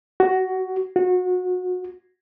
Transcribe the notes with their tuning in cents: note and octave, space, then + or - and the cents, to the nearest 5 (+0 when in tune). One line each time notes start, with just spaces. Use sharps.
F#4 +15
F#4 -25